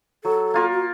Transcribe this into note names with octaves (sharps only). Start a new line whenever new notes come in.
F#3 A4
A#3 F4 A#4
F#4